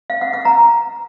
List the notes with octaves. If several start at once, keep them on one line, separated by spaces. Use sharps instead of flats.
F5
F#5
F#5
A#5